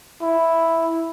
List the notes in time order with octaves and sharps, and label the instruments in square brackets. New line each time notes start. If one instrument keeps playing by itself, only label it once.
[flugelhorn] E4